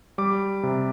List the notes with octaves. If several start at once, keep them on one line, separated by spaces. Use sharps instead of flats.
G3 D6
C3